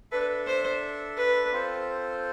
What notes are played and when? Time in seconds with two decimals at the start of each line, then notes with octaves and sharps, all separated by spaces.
0.12 D4 A4 B4 E5
0.46 C5
1.17 B4
1.53 C4 F4 A4 C5